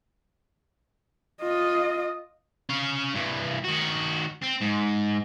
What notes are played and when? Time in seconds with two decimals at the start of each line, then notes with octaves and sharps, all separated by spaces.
1.41 F4 D#5
2.69 C#4 F5
3.15 G2 E3
3.64 D#3 F#4
4.43 C4
4.62 G#2